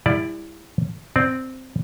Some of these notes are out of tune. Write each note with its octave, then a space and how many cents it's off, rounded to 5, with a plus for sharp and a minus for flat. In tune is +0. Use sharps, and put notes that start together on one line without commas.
G3 +35 E4 +0 D5 +0
C4 -5 D5 +0